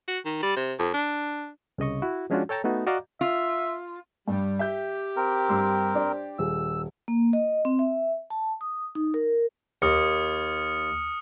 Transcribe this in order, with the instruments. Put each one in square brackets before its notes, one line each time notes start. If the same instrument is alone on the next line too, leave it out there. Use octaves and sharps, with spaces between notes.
[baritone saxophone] F#4
D#3
G3
C3
F2
D4
[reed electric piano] C2 C#3 D#5 C#6
E4 F#4
F3 G#3 C#4 D4 F4 F#4
A4 C#5 G5 A5 A#5
A3 B3 D#4 F#4
F#4 D5 D#5 F5 A#5 D6
[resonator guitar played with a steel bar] F4 [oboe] E5
[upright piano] G2 [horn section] G3
[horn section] G4 [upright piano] E5 G6
[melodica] C4 A#4
[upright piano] G2 C6 E6
D4 C5 D5
[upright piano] D#1 G#4 [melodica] E6
[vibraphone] A#3
D#5
C4
E5
A5
D#6
D#4
A#4
[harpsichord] D#2 [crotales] D#6 F6 C#7